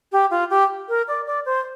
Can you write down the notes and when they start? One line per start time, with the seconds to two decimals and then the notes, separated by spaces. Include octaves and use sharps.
0.12 G4
0.31 F4
0.50 G4
0.89 A#4
1.08 D5
1.27 D5
1.46 C5